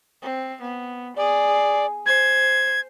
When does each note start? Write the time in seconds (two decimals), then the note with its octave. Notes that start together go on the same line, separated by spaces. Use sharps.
0.22 C4
0.61 B3
1.16 G#4 D5
2.06 C5 G#6